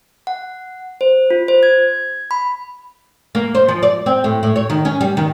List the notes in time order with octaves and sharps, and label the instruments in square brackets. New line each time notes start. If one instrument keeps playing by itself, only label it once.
[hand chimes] F#5
C5
F4
C5
G#6
B5
[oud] A#3
C5
F3
D5
C4
A2
A2
C#5
D#3
C#4
G3
D#3